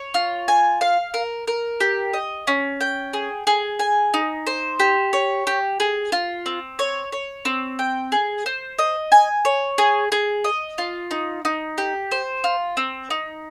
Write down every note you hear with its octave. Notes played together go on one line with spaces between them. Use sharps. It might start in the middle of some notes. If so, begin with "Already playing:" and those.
Already playing: C#5
F4
G#5
F5
A#4
A#4
G4
D#5
C#4
G5
G#4
G#4
G#5
D#4
C5
G4
C#5
G4
G#4
F4
C4
C#5
C#5
C4
G5
G#4
C5
D#5
G#5
C#5
G#4
G#4
D#5
F4
D#4
D#4
G4
C5
F4
C4
D#4